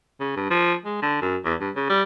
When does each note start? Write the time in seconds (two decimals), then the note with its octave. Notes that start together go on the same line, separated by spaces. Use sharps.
0.20 C#3
0.36 G2
0.50 F3
0.85 G#3
1.02 D3
1.21 F#2
1.45 E2
1.61 G2
1.76 C#3
1.90 G3